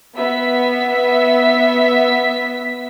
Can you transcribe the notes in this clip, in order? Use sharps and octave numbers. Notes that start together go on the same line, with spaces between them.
B3 E5 B6